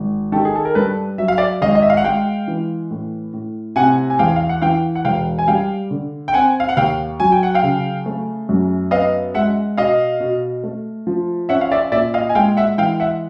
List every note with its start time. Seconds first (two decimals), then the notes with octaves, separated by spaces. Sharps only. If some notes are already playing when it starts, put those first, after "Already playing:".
Already playing: G#1
0.32 D#3 G4 A4
0.45 G#4
0.55 A4
0.65 A#4
0.75 G2 A4 B4
1.18 F#3 E5
1.28 F5
1.38 D5 E5
1.62 G#1 D#5 F5
1.75 D#5
1.82 E5
1.90 F5
1.97 F#5
2.04 G#3 F5 G5
2.48 E3
2.91 A2
3.33 A2
3.76 C3 F#5 G#5
4.10 G#5
4.19 E2 F5 G5
4.36 F5
4.49 F#5
4.62 E3 F5 G5
4.95 F#5
5.05 E1 F5 G5
5.39 G#5
5.48 G3 F5 G5
5.91 D3
6.28 G5
6.34 C4 F#5 G#5
6.60 F5
6.69 F#5
6.77 D#2 F5 G5
7.20 F#3 G#5
7.32 G5
7.43 F#5
7.54 F5 G5
7.63 C#3
8.06 A3
8.49 F#2
8.91 B3 D#5 F5
9.34 G#3 E5 F#5
9.77 B2 D#5 F5
10.20 B2
10.64 A3
11.07 F3
11.49 C#4 E5 F#5
11.61 F5
11.71 D5 E5
11.92 A#2 D5 E5
12.14 D#5 F5
12.29 G#5
12.35 G#3 F5 G5
12.57 E5 F#5
12.78 E3 F5 G5
13.00 E5 F#5